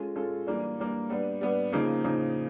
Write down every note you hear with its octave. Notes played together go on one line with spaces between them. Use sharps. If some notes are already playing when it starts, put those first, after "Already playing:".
Already playing: G#3 C#4 F4 A4
G#3 C#4 F4 A4
E3 G3 A#3 D4
E3 G3 A#3 D4
G3 B3 D4
G3 B3 D4
C#3 F3 A#3 D#4
C#3 F3 A#3 D#4